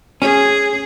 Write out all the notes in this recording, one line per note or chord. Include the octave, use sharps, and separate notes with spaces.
C#4 G#4